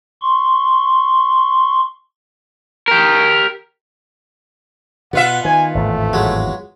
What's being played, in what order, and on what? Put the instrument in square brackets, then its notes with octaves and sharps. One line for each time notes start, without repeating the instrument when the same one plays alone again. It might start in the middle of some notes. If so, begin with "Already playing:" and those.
[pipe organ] C6 C#6
[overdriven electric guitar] G4 A#4
[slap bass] B2 [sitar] B3 F4 E5 [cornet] F#5
[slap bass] D#3 [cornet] G#5
[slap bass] G#1 E2 A2 [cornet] A3
[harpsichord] F#3 G#3